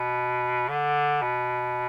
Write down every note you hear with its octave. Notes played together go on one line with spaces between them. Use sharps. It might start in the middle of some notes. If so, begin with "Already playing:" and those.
Already playing: B2
D3
B2